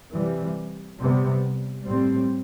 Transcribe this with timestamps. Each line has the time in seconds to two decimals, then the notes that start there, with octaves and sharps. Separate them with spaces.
0.12 C3 E3 G3
1.00 C3 G3 B3
1.87 A2 G3 C4